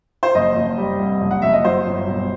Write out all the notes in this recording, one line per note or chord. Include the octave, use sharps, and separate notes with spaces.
C5
F#1 D#5
F#1
G3
C2
F#1
F#5
F#1 E5
D#5
F#3 C5
G1
B1